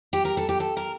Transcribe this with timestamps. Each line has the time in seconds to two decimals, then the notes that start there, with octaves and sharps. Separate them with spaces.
0.13 G4
0.25 A#4
0.37 A4
0.49 G4
0.60 A4
0.77 A#4